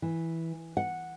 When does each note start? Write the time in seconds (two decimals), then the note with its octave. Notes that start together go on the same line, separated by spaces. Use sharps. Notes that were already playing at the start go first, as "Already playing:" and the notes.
0.02 E3
0.77 F#5